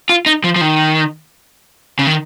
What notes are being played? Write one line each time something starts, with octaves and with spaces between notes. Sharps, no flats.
F4
D#4
F3
F3
D#3
C#3
D#3